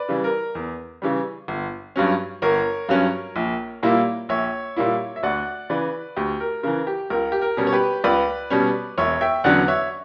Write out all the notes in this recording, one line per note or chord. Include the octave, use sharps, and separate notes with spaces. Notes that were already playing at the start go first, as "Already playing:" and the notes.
Already playing: B4 D5
C#3 E3 G3
A#4
E2
C#3 E3 G3
G1
G2 F#3 C#4
G1 A#4 C#5
G2 F#3 C#4
A#1
A#2 G3 A#3 E4
A#1 C#5 E5
A#2 G3 A#3 E4
E5
D2 D5 F#5
C#3 E3 B4 D5
D2 G4
A#4
C#3 E3 A#4
G4
C#2 A#4
G4
A#4
B2 G3 C#4
C#5
G4 B4
C#2 B4 D5
B2 G3 C#4
E1 C#5 E5
E5 G5
E2 D3 F#3 C#4 D5 F#5
C#5 E5